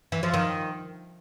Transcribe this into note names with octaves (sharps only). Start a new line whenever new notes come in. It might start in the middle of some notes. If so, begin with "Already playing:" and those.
E3
F3
D#3